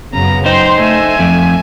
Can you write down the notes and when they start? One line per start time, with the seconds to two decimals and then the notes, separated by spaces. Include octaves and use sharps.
0.14 F#2 C#3 B3 A#5
0.46 D#4 C5 G5 C6
0.79 A3 E5 G#5
1.19 F2